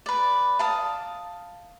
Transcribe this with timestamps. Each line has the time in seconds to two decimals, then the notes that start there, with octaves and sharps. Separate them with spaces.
0.06 B4 D5
0.59 F5 A5 D#6